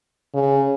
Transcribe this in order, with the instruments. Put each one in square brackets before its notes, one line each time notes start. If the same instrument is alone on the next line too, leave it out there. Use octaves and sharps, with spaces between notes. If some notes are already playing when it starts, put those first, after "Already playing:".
[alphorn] C#3